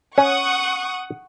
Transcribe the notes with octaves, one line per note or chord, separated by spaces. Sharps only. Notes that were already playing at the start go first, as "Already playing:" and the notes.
C#4 F#5 C#6 D#6